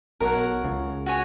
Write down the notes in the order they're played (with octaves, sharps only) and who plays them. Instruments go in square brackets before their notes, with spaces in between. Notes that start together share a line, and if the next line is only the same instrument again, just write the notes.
[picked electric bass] B1 B2 [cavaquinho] A#4 C#5 F#5
[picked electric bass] C#2 C#3
[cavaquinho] F#4 C#5 G#5